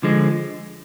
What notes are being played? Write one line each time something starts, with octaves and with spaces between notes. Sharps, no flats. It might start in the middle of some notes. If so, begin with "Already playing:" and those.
D3 F3 G#3